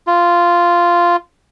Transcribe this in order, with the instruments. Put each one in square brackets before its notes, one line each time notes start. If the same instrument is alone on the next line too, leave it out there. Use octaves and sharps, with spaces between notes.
[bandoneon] F4